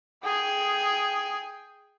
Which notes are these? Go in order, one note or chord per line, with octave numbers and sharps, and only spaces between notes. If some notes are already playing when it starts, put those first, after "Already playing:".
G#4 G5